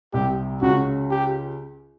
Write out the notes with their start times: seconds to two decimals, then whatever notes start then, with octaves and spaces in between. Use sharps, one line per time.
0.13 C2 C3 G4
0.61 C#2 C#3 F#4
1.11 G4